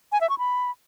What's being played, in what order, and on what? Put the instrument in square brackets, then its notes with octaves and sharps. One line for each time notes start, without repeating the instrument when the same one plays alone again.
[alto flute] G#5
E5
C#6
B5